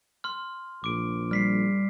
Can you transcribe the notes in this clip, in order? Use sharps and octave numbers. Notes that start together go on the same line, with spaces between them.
C6 F6
A#1 D6 D7
G3 F6 B6 C7